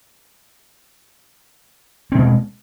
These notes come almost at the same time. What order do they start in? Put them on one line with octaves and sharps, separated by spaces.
C4 B2 G#3